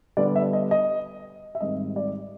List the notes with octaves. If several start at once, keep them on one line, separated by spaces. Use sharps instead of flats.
D3 G3 B3 D4 D5
E5
D#5
D#5
E5
G#2 D#3 G3 C4 D#5
D5